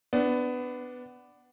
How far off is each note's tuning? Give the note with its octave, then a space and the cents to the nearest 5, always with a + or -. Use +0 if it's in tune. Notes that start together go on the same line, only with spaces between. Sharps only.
B3 +15 D4 +0